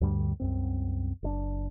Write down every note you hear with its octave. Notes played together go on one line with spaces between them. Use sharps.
D2 G2 D3 G3
C2 F#2 C4
F#1 C#3 D4